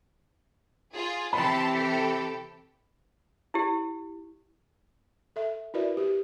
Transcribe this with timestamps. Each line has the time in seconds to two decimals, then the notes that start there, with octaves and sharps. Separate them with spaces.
0.93 F4 G#4
1.33 C3 E3 G5 A5 B5 C6
1.73 G4 A4 G5
3.54 E4 G4
5.36 A4 E5
5.74 E4 F#4 A#4 B4 D5 E5
5.97 G4